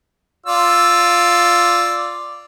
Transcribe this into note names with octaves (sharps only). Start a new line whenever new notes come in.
F4 D5 E6